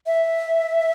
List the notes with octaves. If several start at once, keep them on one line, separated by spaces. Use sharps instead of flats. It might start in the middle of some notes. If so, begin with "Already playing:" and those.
E5